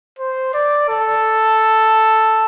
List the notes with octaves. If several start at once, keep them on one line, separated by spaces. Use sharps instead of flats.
C5
D5
A4